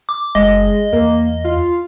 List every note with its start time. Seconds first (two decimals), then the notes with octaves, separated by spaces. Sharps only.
0.09 D6
0.35 F#1 G#3 D#5
0.92 E2 A#3
1.44 F4